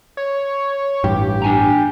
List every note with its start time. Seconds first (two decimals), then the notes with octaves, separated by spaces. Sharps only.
0.17 C#5
1.04 A1 G2 G4
1.42 D4 G#5 A#5